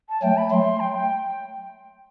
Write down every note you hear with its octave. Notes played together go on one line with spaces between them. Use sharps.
A5
F#3 A3 G5
B5
F#3 A3 C6
G5
G5